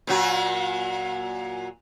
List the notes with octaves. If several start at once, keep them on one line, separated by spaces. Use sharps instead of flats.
A#2 F#3 F#4